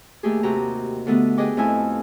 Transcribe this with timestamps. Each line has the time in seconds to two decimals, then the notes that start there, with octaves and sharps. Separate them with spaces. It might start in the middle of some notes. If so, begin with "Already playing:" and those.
0.23 D#2 A3 G4 G#4
0.43 C3 F#4 G4 A#5
1.07 D3 A3 B3
1.37 G4 G#4 B4 D#5 G5 D6
1.57 F2 A3 E4 G#5